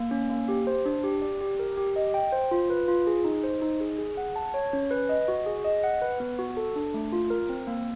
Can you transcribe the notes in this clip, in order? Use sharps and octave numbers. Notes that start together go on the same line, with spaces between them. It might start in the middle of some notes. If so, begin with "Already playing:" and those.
Already playing: A#3
C#4
A#3
G4
C5
D4
G4
D5
G4
A#4
G4
D#5
G5
C5
F4
B4
F4
G#4
D#4
C5
D#4
G#4
G#4
F#5
A5
C#5
C#4
B4
D#5
F#4
G#4
D#5
F#5
B4
B3
F#4
A4
D4
A3
F4
A#4
C4
A#3